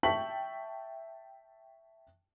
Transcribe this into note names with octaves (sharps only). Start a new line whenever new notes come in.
E5 G5 A5 C#6 B6 F#7